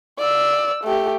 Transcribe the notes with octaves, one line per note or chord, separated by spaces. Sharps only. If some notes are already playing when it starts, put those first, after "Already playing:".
D5 E6
A3 G4